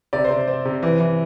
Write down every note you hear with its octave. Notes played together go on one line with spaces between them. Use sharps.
C3 D5
C5
C3
C4
C3
E3
E3